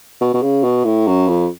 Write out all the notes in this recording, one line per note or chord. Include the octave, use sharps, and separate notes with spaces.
B2
B2
C#3
B2
A2
F#2
F2